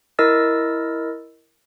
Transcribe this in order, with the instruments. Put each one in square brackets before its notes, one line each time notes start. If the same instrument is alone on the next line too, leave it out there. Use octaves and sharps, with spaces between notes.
[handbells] E4 A#4 D#5 E6 A6